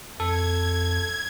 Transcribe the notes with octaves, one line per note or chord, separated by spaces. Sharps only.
F2 A4 G#6